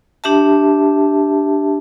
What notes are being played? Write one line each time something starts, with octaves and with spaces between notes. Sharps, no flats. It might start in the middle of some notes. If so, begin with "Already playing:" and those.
D4 G4 E5 A5